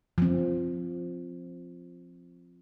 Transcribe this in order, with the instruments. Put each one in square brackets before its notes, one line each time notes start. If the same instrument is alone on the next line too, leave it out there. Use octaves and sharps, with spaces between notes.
[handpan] F3 C4